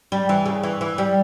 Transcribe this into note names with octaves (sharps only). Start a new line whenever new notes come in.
G3
E3
C#3
E3
E3
G3